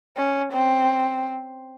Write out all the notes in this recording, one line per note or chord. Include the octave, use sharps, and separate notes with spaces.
C#4
C4